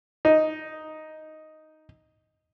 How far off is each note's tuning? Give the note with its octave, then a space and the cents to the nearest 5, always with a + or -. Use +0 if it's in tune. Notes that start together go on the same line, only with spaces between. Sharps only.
D#4 +0